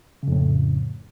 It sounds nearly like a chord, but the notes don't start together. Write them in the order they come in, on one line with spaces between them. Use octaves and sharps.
C#3 F2 A2